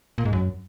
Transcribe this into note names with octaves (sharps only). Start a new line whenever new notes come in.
A#2
G#2
F#2